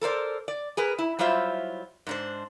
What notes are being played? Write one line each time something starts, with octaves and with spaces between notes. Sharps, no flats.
A4 A#4 C5 D5
D5
G#4 A#4 B4
E4
F#3 G3 E4 F4 C5 E5
G#2 D4 C5